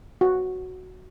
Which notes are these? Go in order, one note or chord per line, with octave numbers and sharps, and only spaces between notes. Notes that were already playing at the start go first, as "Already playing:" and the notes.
F#4